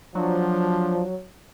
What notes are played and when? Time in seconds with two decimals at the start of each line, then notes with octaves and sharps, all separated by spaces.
0.15 F3 F#3 D4